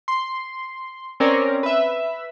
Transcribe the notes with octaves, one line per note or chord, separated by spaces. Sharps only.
C6
C4 C#4 A#4 C#5 D5
B4 E5